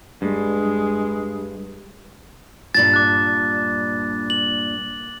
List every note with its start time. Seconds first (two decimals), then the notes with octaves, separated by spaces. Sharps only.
0.22 G2 G#3
2.75 G2 A#2 A5 A6
2.93 D6 F#6
4.30 F#7